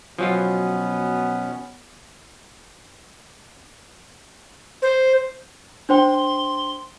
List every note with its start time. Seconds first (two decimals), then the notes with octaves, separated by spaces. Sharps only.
0.19 B2 F3 F#3 B3 C#4 F4
4.82 C5
5.89 D4 C5 G5 C6